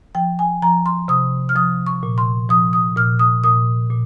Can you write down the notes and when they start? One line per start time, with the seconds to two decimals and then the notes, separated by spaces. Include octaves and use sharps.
0.15 F3 G5
0.39 G#5
0.62 F3 A#5
0.86 C6
1.08 C3 D#6
1.49 F6
1.56 F3 D#6
1.86 C#6
2.03 A#2
2.18 C6
2.49 F3 D#6
2.73 D#6
2.96 A#2 F6
3.19 D#6
3.44 A#2 D#6
3.90 A#2